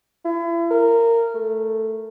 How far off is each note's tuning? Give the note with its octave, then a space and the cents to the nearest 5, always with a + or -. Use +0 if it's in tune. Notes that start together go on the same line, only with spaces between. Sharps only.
E4 +35
A#4 -15
A3 +5